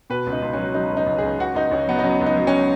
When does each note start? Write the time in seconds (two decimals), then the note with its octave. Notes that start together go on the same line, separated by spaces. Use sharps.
0.10 B2 B4
0.27 C#2
0.32 D#4
0.42 C#2
0.53 F#3 C#4
0.74 F#3 D#4
0.92 C#2
0.97 D#4
1.07 C#2
1.18 C#2 G#4
1.39 C#2 F#4
1.55 C#2 D#4
1.71 C#2 C#4
1.87 F#3 B3
1.99 D#4
2.04 F#3 C#4
2.21 C#2
2.26 D#4
2.37 F#3
2.47 C#4